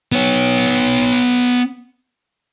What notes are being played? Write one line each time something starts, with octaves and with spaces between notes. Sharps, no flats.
B3 C#5